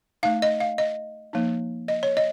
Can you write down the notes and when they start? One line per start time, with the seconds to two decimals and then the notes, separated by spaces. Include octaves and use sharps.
0.23 A3 D#4 F5
0.42 D#5
0.60 F5
0.78 D#5
1.33 F3 A#3 D#4
1.88 D#5
2.03 C#5
2.17 D#5